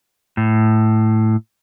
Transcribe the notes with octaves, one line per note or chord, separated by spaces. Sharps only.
A2